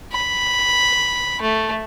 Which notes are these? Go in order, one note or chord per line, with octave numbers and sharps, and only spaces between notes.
B5
A3